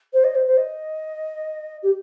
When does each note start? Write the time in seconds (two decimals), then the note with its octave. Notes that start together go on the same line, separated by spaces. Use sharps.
0.13 C5
0.24 D#5
0.35 C5
0.46 C5
0.57 D#5
1.83 G4